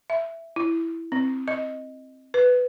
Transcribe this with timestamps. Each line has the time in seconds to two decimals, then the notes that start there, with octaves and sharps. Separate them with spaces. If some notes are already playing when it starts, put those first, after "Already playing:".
0.10 E5
0.56 E4
1.12 C4
1.48 D#5
2.34 B4